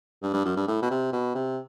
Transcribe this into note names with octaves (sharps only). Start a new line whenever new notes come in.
G2
G2
F#2
G2
A2
B2
C3
B2
C3